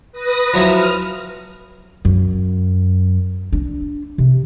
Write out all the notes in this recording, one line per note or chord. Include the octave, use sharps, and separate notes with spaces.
B4 D#6 A#6
F3 F#3 E4 F6
F#2
D4
C3